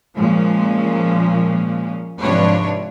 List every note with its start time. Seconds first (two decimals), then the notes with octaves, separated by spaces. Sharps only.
0.17 A#2 F3 G#3 C#4
2.20 G#2 C3 F3 D4 B4 C#5